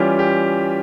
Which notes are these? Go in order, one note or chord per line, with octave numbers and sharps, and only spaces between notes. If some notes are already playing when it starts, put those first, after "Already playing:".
Already playing: E3 G3 C#4 F4 G4
G4